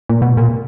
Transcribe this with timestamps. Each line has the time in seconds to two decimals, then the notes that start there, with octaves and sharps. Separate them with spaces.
0.09 A#2
0.22 B2
0.37 A#2